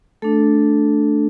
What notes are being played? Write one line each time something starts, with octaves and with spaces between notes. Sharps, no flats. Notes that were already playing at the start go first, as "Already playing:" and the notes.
A3 D4 A4